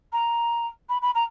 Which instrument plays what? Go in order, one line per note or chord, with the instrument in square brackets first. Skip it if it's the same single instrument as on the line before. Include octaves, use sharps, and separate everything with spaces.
[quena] A#5
B5
B5
A#5